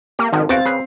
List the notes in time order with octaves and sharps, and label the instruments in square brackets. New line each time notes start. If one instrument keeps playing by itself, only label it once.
[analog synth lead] A#3 [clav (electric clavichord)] G4
[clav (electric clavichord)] G#1 F3 [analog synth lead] D#3
[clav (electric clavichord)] E2 F#4 G5 [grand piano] C4 F5 [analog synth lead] A6
[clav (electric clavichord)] C#3 B4 [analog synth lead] C7